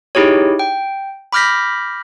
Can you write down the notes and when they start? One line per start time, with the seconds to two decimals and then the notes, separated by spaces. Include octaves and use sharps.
0.15 D#4 E4 G4 G#4 C#5
0.59 G5
1.33 B5 D6 F6 G6 A#6 B6